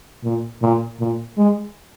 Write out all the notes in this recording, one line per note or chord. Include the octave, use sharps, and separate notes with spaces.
A#2
A#2
A#2
G#3